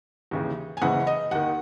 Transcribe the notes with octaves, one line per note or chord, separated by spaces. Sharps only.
D#2 C#3 E3
G#5
F#1 E2 C#3 E3 F#5
D#5
D#2 D#3 F#5